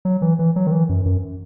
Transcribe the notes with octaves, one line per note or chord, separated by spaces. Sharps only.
F#3
E3
E3
F#3
D#3
E3
F#2
F#2